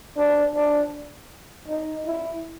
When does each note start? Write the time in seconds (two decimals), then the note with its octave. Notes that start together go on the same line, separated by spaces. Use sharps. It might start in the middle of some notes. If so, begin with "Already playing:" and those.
0.17 D4
0.55 D4
1.68 D#4
2.07 E4